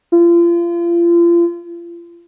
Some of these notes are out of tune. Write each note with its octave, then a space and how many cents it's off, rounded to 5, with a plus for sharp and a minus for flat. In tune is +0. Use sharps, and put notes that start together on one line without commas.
F4 -35